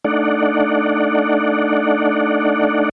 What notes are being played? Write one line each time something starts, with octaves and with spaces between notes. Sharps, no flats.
A3 D4 D#4 D5 F#5